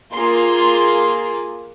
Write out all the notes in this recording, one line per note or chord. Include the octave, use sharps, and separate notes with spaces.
A#3 F4 G#4 C6